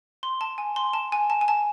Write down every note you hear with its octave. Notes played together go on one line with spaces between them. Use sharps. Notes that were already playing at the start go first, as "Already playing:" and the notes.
C6
A5
G#5
C6
A5
G#5
A5
G#5
A5